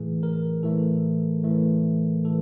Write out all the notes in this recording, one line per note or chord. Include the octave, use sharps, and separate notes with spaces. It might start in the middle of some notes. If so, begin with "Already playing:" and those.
Already playing: A2 E3 A3 G#4
A#4
A2 E3 A3 A4
A2 E3 A3
A2 E3 A4